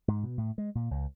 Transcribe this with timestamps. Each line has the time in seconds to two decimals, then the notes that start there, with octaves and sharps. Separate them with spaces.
0.08 G#2
0.23 B2
0.38 A2
0.58 G#3
0.75 A#2
0.91 C#2